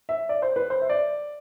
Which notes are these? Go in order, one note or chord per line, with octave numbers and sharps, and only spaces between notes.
E5
D5
C5
B4
C5
E5
D5